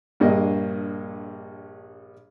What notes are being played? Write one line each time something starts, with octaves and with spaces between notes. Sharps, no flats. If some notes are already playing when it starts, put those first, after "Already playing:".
A#1 G2 A#3 D#5